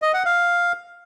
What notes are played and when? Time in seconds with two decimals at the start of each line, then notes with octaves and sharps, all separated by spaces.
0.02 D#5
0.14 F#5
0.25 F5